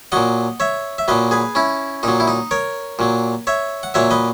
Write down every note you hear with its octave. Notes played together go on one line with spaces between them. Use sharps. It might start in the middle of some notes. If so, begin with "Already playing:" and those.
A#2 F#3 D#5 F#5
C#5 E5
E5
A#2 F#3 B4 D#5
G#4 B4
C#4 E4
A#2 F#3 D#4
E4
D#4
A#4 C#5
A#2 F#3
C#5 E5
F#5
A#2 F#3 C#5 E5
B4 D#5